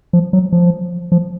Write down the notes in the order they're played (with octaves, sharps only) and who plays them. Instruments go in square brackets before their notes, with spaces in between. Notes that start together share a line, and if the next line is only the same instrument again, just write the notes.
[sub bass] F3
F#3
F3
F3